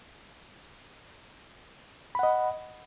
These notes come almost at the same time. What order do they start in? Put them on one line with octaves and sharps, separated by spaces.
B5 F#5 D#5